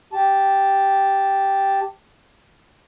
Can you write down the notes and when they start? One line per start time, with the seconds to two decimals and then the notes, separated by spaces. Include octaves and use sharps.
0.13 G4 A5